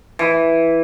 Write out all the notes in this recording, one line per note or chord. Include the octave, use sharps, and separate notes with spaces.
E3